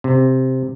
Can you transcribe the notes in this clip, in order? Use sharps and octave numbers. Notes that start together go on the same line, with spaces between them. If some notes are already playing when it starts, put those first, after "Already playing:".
C3